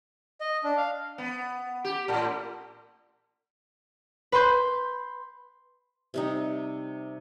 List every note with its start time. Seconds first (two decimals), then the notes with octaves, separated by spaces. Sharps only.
0.41 D#5
0.64 D4
0.77 F5
1.18 B3
1.85 G4
2.08 A2
4.32 B4 B5 C6 G6
6.14 C3 G3 D#4